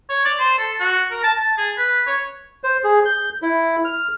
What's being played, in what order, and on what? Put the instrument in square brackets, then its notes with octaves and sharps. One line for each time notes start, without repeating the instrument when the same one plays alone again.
[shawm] C#5
D5
C5
A4
F#4
A#4
A5
A5
G#4
B4
C#5
[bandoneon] C5
G#4
G6
E4
F6